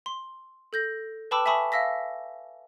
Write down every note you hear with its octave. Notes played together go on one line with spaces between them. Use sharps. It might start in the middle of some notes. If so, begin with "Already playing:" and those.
C6
A4 G6 A#6
B4 G5 A5 B5 D6 E6
E5 G#5 A5 B5 C#6 D#6
E5 F5 E6 A#6 B6